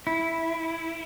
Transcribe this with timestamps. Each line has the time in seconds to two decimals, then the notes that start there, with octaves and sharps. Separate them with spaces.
0.07 E4